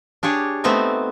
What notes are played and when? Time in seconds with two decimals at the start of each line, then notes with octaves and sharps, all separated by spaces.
0.23 D4 G4 G#4 C#5
0.64 A3 B3 C4 D#4 E5